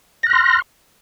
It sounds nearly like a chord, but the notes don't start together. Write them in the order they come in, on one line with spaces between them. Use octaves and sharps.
A#6 F#6 F6 C6